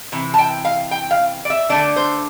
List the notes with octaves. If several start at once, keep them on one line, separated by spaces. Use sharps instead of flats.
C3 E3
A5
G5
F5
G5
F5
D5
E5
D3 A3 D4 D5
C5